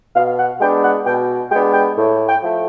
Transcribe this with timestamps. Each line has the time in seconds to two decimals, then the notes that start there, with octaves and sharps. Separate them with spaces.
0.15 B2 F5
0.38 F#5
0.60 G#3 B3 D4 G5
0.83 F#5
1.05 B2 G5
1.51 G#3 B3 D4 G5
1.73 G5
1.96 A2
2.27 G5
2.42 F3 A3